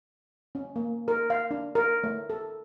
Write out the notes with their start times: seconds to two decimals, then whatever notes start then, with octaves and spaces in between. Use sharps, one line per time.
0.55 C#4
0.76 A#3
1.08 A#4
1.30 F5
1.51 D4
1.75 A#4
2.04 A3
2.30 A4